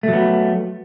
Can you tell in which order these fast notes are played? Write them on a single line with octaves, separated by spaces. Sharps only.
A3 F#3 B3